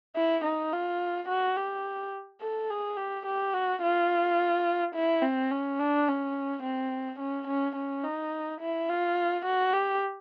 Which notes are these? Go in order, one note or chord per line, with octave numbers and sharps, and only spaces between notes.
E4
D#4
F4
F#4
G4
A4
G#4
G4
G4
F#4
F4
E4
C4
C#4
D4
C#4
C4
C#4
C#4
C#4
D#4
E4
F4
F#4
G4